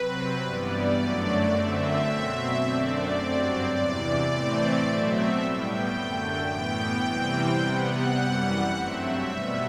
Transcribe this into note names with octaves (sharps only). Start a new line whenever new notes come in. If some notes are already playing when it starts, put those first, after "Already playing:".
Already playing: C3 F#3 C4 B4
G2 E3 G3 B3 D5
F#2 D3 F#3 A3
F#2 D3 A3 C4 E5
B2 F#3 C4
F#2 D3 A3 C4 D5
G2 F#3 C4
E2 C3 E3 D5
A2 E3 A3 C4
B2 F#3 A3 C4 E5
A2 G3 B3 G5
F#2 D3 A3
A2 E3 B3 G5
C3 E3 G3 C4
C3 G3 B3 F#5
F#2 E3 G3
G2 F#3 A3 C4 E5
B2 G3 B3